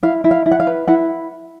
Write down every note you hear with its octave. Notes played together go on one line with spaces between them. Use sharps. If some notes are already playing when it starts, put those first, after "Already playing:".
E4 F5
E4
F5
E4
F#5
F5
B4
E4 F#5